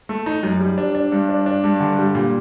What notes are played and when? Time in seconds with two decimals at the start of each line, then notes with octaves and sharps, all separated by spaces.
0.09 A3
0.26 D#4
0.43 F#2
0.60 G3
0.78 D4
0.95 D4
1.12 G2
1.29 D4
1.46 D4
1.64 G2
1.80 D3
1.98 G3
2.15 A#2